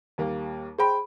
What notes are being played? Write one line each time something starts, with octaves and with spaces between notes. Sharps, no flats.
D#2 G3 A#3
G#4 C5 G5 B5